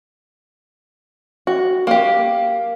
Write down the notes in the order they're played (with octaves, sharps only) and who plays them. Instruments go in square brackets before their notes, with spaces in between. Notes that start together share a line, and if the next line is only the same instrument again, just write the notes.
[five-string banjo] F#4
[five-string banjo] A#3 G4 [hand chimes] F5